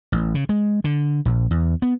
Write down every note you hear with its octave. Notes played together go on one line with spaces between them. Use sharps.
A1
C#3
G#3
D3
A#1
E2
B3